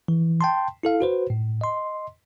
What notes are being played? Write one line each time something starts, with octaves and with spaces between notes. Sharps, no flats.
E3
G5 A5 C6
E4 A4 F5
F#4 B4 C5
A2
D#5 C6